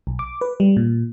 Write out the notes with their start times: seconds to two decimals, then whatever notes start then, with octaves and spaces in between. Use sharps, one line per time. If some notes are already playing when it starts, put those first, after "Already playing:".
0.07 B1
0.19 D6
0.41 B4
0.60 G3
0.77 A#2